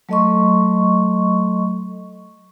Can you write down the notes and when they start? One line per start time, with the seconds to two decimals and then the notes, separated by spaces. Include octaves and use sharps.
0.09 F#3 A3 A4 D#5 C6 C#6